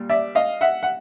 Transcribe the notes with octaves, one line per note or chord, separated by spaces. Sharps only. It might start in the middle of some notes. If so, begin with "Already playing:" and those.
Already playing: A#2 G3
D5 E5
D#5 F5
E5 F#5
F#5